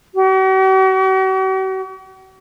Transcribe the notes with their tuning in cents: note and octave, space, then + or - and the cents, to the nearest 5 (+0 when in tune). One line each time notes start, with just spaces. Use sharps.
F#4 +45